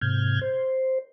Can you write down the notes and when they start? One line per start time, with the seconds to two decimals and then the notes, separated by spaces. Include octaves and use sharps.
0.01 G#2 C3 F6 G6 G#6
0.41 C5